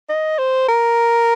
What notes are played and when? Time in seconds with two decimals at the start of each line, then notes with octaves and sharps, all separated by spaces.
0.09 D#5
0.39 C5
0.68 A#4